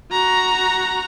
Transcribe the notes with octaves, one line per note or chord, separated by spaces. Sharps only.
F#4 A#5